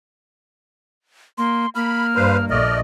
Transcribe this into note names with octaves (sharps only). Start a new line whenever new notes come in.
A#3 C6
A#3 B5 F6
G2 B4 C5 F5
A#1 A3 D5 D#5 F6